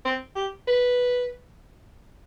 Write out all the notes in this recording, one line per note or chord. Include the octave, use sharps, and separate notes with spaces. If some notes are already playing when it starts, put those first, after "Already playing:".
C4
G4
B4